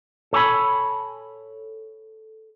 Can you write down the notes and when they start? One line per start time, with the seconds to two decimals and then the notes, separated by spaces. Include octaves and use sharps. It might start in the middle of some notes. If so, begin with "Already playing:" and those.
0.33 A4 C#5 G#5 B5